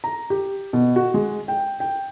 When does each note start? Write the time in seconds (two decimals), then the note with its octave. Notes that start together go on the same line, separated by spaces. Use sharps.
0.04 A#5
0.30 G4
0.73 B2
0.96 F#4
1.14 G#3
1.48 G5
1.80 G5